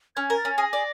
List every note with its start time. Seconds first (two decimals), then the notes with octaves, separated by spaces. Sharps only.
0.16 C#4 G#6
0.30 A#4
0.37 A6
0.45 C#4
0.58 G#4 A#6
0.73 D5